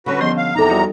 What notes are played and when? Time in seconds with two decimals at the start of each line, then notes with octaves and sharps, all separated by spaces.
0.06 D3 G3 C#4 F#4 B4
0.20 E2 F3 B3 D#5 C6
0.37 F5
0.55 E2 C3 D#4 A4 A#5
0.69 G3 F#4 G5